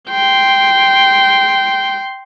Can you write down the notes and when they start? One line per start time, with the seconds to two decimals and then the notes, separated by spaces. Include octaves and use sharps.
0.10 G5 C6